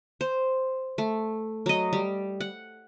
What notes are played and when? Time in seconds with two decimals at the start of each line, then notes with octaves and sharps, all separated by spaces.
0.21 C5
0.98 A3
1.66 F#3 D#5
1.93 G3
2.40 F#5